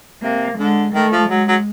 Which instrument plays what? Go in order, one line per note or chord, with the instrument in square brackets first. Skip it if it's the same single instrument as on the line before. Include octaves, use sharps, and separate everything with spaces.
[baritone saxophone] C3 [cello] A#3
[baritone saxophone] D3 [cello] G#3
[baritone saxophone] D#3 [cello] A3
[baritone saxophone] F3
[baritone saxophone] F#3 [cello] G#3
[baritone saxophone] F#3